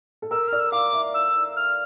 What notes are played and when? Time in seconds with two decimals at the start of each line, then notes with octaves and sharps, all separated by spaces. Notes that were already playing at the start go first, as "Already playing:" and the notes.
0.22 A4
0.31 A#4 E6
0.48 D5 F6
0.60 E6
0.72 F5 D6
0.93 E5
1.14 E6
1.56 F6